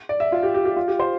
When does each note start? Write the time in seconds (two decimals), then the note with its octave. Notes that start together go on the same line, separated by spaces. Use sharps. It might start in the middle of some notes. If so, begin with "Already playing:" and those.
0.09 D5
0.20 E5
0.32 F4
0.43 G4
0.54 G4
0.65 G4
0.76 F4
0.88 G4
0.99 C5